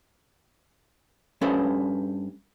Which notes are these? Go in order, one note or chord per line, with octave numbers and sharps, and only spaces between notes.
G2 C#4 A4 B4 C5